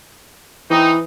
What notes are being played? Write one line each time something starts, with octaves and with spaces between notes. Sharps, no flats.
E3 C4 D#4